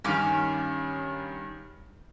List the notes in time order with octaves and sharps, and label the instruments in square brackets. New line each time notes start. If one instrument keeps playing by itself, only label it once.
[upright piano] G2 D#3 [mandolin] C#4 F5 D6